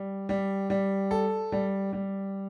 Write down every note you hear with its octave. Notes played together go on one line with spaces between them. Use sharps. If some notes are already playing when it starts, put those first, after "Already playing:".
Already playing: G3
G3
G3
A4
G3
G3